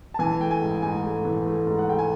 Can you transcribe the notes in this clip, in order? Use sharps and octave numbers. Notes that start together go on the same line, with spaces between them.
A5
E3 G#5
A3 G5
G#5
G#2
G#2 G#5
A3
E3
A3
G#2
F#5
A3 G5
G#5